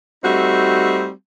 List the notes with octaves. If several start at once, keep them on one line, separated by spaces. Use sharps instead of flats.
G3 A3 C4 D#4 F#4